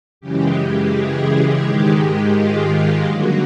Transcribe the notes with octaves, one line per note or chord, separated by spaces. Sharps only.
F#2 C#3 E3 G#3 G4
G#4
G#2 D#3 G#3 G4
G4
F4
G4
G2 D3 F#3 A#3 F#4